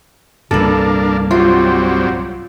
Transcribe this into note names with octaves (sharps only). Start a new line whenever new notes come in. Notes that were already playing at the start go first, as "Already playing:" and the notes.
C2 G2 A#2 A#3 D4 A4 B4
F#3 G3 C4 F4